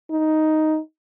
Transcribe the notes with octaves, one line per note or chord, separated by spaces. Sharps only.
D#4